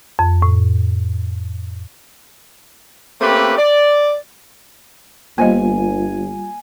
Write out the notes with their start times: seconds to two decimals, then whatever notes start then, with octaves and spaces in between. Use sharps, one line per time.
0.19 F2
0.42 A2
3.21 A3 A#3 C4 C#4 G4 B4
3.58 D5
5.38 G1 G3 A#3 F4 C5 D#5 G#5